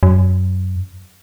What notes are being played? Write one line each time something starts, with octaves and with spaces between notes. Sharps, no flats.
F#2